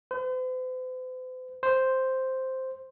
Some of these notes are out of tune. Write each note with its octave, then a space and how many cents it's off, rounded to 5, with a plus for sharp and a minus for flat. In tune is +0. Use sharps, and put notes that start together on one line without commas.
C5 -45
C5 +0